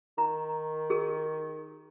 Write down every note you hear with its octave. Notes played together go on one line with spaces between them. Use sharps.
D#3 A#5
G#4 A#4